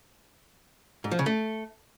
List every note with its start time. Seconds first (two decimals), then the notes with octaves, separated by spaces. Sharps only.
1.04 G#2
1.11 F3
1.19 C#3
1.26 A3